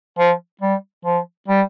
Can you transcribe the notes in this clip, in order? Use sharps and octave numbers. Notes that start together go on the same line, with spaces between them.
F3
G3
F3
G3